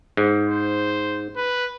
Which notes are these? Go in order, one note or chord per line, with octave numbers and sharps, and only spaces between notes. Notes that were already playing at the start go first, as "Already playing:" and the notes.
G#2
C5
B4